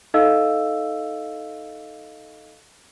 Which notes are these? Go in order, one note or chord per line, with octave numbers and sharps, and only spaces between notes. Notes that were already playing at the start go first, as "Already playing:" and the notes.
D#4 A4 D#5 F5 E6